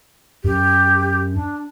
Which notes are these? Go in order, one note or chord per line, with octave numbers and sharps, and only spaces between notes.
F#2 G4
D4